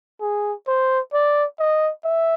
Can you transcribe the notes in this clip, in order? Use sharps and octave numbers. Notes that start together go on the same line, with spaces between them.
G#4
C5
D5
D#5
E5